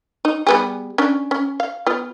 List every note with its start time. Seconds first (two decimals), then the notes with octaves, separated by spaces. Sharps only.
0.25 D#4
0.47 G3 B3 G#4
0.98 C#4 D4
1.31 C#4
1.60 F5
1.87 B3 F4